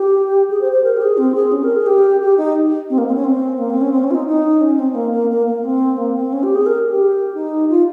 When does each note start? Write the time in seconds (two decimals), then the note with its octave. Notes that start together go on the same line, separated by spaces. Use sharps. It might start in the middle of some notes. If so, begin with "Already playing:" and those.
Already playing: G4
0.50 G#4
0.61 C5
0.72 C5
0.84 A#4
0.97 G4
1.02 G#4
1.18 C4
1.35 G#4
1.52 C#4
1.63 A#4
1.76 G#4
1.86 G4
2.21 G4
2.38 D#4
2.90 C4
2.98 A#3
3.07 C4
3.15 C#4
3.24 C4
3.58 A#3
3.70 C4
3.81 C#4
3.92 C4
4.04 C#4
4.11 F4
4.15 D#4
4.27 D#4
4.61 C#4
4.79 C4
4.95 A#3
5.12 A#3
5.30 A#3
5.46 A#3
5.64 C4
5.98 A#3
6.15 C4
6.33 C#4
6.43 G4
6.55 G#4
6.66 A#4
6.90 G4
7.35 D#4
7.70 F4